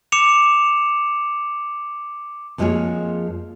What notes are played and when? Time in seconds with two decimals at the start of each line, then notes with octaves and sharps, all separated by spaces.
0.12 D6 C#7 E7 F7
2.58 F2 F3 G#3 A#3 G#4 C#5